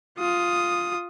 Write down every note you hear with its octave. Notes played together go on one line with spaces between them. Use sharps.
F4 D#6